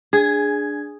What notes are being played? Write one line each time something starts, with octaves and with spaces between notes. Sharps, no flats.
D4 G#4 G#6